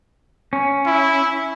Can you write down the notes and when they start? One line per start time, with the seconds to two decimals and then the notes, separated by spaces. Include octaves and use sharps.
0.53 C#4
0.86 E4